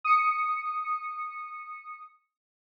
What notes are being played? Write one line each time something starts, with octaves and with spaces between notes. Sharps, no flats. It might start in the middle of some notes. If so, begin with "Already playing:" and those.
D#6 C#7